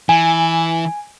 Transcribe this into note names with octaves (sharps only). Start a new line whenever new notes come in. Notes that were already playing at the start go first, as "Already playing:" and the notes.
E3 G#5